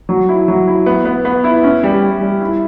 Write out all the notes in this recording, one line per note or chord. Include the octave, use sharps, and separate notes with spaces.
F#3
E4
F#3
E4
B3
B3
B3
E4
C#4
G3
G3
G3
E4